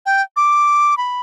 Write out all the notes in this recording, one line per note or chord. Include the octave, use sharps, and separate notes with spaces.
G5
D6
B5